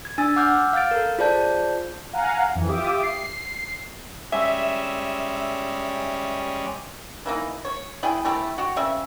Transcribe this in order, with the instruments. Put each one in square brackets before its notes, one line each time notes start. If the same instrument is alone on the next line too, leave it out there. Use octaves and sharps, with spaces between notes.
[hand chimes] G#6
D4 G#5 E6 A6
F#5 D6 E6 F6 G6
F5 F6 G6 A6 D7
A4 A#4
F4 G#4 C5 D5 A5 G6
[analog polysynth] F5 F#5 G#5 A#5
F2 E3
F4 G4 E5 D6 D#6
C7
[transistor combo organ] G3 G#3 C#4 [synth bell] E5
[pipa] E3 A#3 D#4
C#5
E4 G#4 G5
A3 C4 E4 G4
F#4 G4
C#3 C4 E5